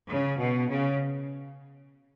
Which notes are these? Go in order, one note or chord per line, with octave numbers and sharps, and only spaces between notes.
C#3
B2
C#3